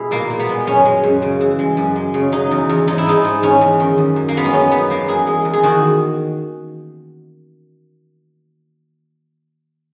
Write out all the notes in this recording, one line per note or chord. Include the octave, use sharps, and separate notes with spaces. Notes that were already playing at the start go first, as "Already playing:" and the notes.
Already playing: B2 G#3 E4 G#4
A#2 A#3
A#2
B3
G#3
F#2 C#4
G#3
F#2
C#3
E3
G#3
F#2
G#3
C#3
F#3 D#4
E2
E2
G#2 D#4
E4
G#2 D#4
G#2
E2 C#4
E2
D#3
F#2
F#2
A#3
G#3 B3
C#4
F#2 D#4
F#2 B3
F#2 A#3
E2 G#4
G#3
E2
G#4
D#3 F#4